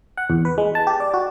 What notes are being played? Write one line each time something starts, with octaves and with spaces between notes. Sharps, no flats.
F#5
E2
B4
G#3
A5
G4
D5
F#4